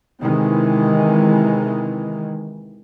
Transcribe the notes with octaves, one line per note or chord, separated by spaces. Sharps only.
C3 D#3 E3 G#3